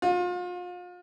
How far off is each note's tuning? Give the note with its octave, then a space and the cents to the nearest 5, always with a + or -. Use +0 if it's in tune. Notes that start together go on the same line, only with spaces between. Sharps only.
F4 +35